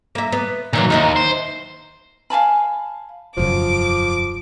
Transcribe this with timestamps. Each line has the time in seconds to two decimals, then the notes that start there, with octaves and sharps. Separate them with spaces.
0.15 A#3 E5
0.32 B3
0.73 A#2 D#3 E3 F#3
0.90 D#2 D#3 D#4 E4
1.16 C5
2.30 F5 G#5 A5 B5
3.37 E1 F#2 C#3 F3 D6